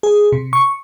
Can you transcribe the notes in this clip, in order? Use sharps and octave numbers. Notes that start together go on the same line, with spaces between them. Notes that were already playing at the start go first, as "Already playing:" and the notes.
G#4
C3
C#6